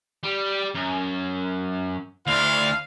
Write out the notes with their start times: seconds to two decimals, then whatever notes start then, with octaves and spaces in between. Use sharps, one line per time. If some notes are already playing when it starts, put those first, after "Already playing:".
0.24 G3
0.75 F#2
2.27 D2 D4 E4 C5 F5